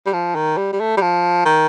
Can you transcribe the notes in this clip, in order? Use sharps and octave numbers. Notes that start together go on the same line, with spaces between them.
G3
F3
D#3
G3
G3
A3
G3
F3
D#3